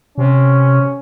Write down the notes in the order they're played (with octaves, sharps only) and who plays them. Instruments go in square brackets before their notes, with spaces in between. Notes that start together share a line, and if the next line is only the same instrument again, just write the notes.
[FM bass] C3 [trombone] C#4